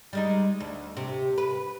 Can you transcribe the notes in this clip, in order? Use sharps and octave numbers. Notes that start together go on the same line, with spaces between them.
G3 G#3 D#4
D2
C3
B4